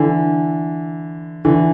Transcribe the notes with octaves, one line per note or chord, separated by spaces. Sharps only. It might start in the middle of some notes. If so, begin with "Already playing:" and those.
Already playing: D3 E3
D3 E3